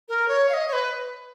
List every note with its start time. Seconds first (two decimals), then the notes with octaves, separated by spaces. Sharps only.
0.09 A#4
0.28 C#5
0.49 F5
0.54 D#5
0.68 C#5
0.73 B4